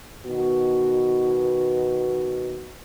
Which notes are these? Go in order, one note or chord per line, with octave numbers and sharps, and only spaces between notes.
B2 D#3 B3 F#4